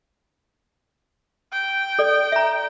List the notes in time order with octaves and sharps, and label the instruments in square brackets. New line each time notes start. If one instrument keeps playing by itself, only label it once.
[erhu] G5
[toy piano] A4 D5
E5 A#5